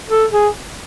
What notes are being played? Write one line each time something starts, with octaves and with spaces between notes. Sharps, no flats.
A4
G#4